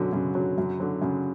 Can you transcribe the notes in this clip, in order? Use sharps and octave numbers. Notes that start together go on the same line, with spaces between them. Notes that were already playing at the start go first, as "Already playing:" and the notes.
Already playing: F#2 B2 D3 F#3
F#2 C#3
D3 F#3
F#2
D3 F#3
F#2 C#3